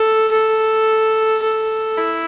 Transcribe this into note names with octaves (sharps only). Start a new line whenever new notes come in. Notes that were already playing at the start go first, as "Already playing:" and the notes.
Already playing: A4
A4
A4
E4